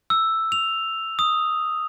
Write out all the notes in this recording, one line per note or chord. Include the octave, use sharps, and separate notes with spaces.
E6
F7
D#6